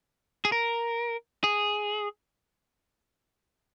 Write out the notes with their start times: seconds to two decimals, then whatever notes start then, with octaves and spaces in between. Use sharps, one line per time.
0.45 G#4
0.52 A#4
1.44 G#4